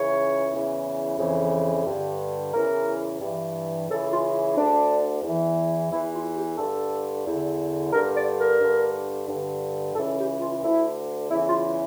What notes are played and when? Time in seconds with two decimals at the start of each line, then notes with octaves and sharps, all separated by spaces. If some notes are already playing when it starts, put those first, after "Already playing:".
Already playing: C#2 C#3 E3 C#5
0.51 E2 C#3 E3
1.18 F2 C#3 E3
1.85 G2 D3
2.52 E2 C#3 E3 A#4
3.20 G2 E3
3.88 C#2 C#3 E3 A4
4.10 F4
4.55 D2 D3 D4
5.22 E2 E3
5.90 E2 E3 E4
6.13 F4
6.35 G4
6.57 G2 D3 A4
7.25 E2 D3
7.92 G2 D3 A#4
8.15 D5
8.38 A#4
8.60 G2 D3
9.27 G2 D3
9.94 C#2 C#3 E3 A4
10.17 G4
10.39 F4
10.61 D2 D3 E4
11.29 E2 C#3 E3 E4
11.46 F4